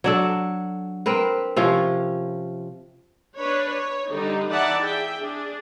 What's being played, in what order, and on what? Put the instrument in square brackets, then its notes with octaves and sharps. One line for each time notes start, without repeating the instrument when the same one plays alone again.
[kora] F#3 D4 A4
C4 A#4 B4
C3 F3 C#4
[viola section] D4 B4 C#5
C#5
D3 G3 D#4
E3 D#4 D5 E5 F#5 A5
G#4 E5 G5
D4 G#4